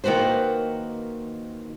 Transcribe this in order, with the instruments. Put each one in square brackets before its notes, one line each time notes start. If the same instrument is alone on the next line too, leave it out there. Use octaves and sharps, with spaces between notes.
[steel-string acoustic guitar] D#3 A#3 F#4 B4 C5